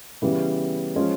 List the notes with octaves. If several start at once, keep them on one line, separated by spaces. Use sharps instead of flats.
C#3 E3 G3 B3
F3 G#3 C#4 F4